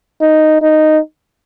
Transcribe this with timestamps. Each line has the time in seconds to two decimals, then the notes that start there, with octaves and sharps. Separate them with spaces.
0.21 D#4
0.62 D#4